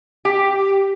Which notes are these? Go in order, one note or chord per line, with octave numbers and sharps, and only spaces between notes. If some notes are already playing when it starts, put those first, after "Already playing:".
G4